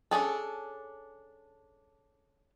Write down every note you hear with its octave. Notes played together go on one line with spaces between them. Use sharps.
C#4 D4 G#4 A4